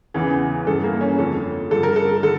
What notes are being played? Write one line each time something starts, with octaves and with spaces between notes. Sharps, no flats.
E2 C#3 E3
G2 E3 A4
A#3
C#4
F2 D3 F3 A4
G2 D3 F3 A4
A#4
A4
D3 A4